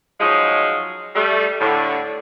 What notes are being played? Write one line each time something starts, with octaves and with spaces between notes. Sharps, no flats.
F3 F#3 G#3 D#4 F4 C#5
G3 A3
A2 D3